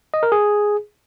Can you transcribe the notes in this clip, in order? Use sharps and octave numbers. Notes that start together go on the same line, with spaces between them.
D#5
A#4
G#4